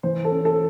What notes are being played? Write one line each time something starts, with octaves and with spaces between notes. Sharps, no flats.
E3 C5
A4
C#4
A4